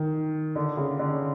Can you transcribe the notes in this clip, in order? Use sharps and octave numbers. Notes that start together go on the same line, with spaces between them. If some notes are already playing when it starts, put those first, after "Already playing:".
Already playing: D#3
D3
C#3
D3